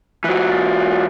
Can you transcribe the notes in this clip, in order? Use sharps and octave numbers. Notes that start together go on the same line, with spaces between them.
E3 F#3